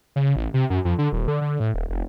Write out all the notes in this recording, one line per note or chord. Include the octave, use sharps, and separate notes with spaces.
C#3
A1
C3
F#2
F2
D3
D#1
D3
D3
A2
D#1
F1